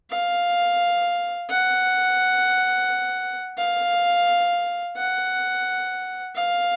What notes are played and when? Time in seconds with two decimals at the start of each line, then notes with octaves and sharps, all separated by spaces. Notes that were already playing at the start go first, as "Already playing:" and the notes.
0.11 F5
1.50 F#5
3.58 F5
4.97 F#5
6.36 F5